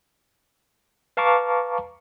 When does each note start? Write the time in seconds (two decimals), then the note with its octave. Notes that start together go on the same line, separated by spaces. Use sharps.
1.17 B4 F5 A5 A#5 C#6 D6